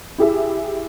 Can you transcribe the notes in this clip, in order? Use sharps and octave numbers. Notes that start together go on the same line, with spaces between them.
E4 G4 G#4 E5